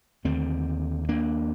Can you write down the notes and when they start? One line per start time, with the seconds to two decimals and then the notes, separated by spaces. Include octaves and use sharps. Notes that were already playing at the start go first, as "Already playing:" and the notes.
0.25 D#2 D3 A3 C4
1.09 A#3 D4